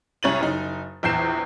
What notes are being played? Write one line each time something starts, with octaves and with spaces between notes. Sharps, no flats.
C2 C#4 C#5 A6 D#7 F#7
F#1 D#4
A#1 E2 G6 C7 E7